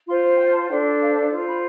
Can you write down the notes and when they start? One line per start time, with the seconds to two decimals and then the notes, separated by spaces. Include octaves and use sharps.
0.06 F4 C6
0.10 C5
0.37 G5
0.54 A5
0.68 D4 A4 C5 G5
1.00 F5
1.31 F4 C5
1.47 B5